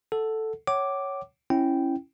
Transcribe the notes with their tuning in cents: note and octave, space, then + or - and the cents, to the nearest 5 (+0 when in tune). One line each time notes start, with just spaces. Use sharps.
A4 +0 F#5 +0
C#5 +0 F#5 +40 D6 +0
C#4 -20 E4 +0 G5 -10